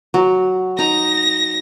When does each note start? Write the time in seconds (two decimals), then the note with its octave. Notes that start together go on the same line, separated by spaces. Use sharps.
0.14 F#3
0.79 D#4 A#5 A#6